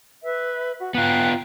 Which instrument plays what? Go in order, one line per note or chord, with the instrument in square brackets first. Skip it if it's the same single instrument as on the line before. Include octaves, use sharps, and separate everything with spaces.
[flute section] B4 E5
F#4
[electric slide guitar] B3 F4 [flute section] G5 A#5 F#6